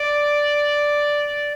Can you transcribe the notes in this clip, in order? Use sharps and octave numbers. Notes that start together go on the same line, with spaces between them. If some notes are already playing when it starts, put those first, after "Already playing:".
Already playing: D5